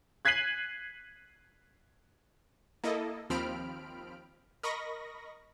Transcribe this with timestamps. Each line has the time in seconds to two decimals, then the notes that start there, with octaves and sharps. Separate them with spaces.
0.25 F#6 G#6 B6 C7 D#7 F#7
2.84 A#3 E4 A4 D#5
3.30 D#2 F3 C4 B5 F6 D7
4.63 A#4 D#5 B5 C#6 A#6